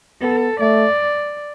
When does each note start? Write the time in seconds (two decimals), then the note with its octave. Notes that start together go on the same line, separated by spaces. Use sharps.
0.21 B3 A4
0.60 A3 D5